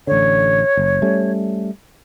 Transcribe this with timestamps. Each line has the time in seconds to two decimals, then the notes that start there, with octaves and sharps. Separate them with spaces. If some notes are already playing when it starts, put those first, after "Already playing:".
0.07 A1 D3 C#5
0.77 F#1
1.02 G3 A3 C#4